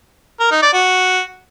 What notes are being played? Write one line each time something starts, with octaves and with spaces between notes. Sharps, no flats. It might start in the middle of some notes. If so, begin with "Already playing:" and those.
A#4
D#4
D5
F#4